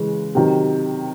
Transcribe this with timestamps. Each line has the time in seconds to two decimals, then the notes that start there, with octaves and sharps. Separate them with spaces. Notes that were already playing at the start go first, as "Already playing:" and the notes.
Already playing: C#3 E3 G#3
0.35 C3 D#3 F#3